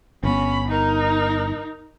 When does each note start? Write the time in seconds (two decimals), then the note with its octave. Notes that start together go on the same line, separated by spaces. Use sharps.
0.23 G1 B3 C#4 B5
0.69 D#4 A#4